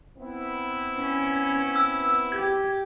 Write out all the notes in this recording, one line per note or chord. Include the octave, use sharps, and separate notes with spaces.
B3 C4 E4
C#4
E6
G4 G#6